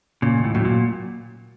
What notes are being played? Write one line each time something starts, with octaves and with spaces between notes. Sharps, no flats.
A#2 C#3
D#2
A2
A2 F#3
A#2